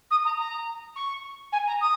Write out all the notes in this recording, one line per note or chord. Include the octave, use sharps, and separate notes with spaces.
D#6
A#5
A#5
C#6
G#5
A#5
D#6